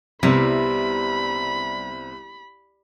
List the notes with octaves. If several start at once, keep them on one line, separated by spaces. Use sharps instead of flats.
C2 C3 G3 B3 E4 B5